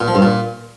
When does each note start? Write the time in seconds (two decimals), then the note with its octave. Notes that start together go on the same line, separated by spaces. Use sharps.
0.01 A#2
0.08 F3
0.15 G2
0.22 A#2